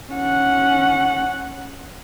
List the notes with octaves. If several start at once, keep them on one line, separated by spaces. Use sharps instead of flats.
C#4 F#5